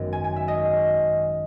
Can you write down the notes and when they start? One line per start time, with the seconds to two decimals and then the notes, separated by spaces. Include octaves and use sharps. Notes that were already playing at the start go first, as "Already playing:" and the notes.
Already playing: G#1 F#2 D#3 G#3 B3
0.13 G#5
0.24 G#5
0.36 E5
0.48 D#5